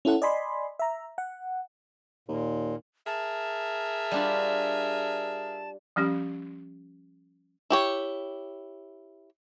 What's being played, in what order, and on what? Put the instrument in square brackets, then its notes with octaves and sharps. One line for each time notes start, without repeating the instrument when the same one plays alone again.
[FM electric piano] C#4 E4 A4 F#5
D5 D#5 G#5 B5 C6
E5 A#5
F#5
[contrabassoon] D#2 [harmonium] A#2
[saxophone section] G#4 A#4 E5 [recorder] A5
[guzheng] G3 D4 F4
[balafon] F3 G3 C#4 G4
[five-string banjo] E4 G4 C#5